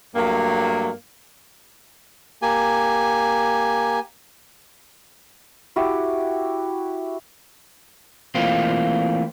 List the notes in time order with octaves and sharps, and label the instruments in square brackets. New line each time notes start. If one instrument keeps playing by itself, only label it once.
[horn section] G2 F#3 A3 A#3
[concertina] A#3 G4 G#5
[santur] E4 F#4 G4
[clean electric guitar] E3 A3 A#3 C4 F4